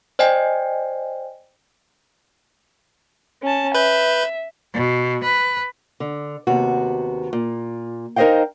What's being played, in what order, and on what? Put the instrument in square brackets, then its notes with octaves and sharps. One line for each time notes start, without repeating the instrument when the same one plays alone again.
[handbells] C5 D5 D#5 G5 G#5
[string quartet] C#4 A5
[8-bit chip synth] B4 G6 [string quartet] E5
[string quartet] B2
B4
[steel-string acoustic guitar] D3
D#2 C3 B3 F#4
A#2
D#4 A#4 C5 D#5 F5 G5